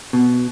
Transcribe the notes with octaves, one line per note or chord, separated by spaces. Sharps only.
B2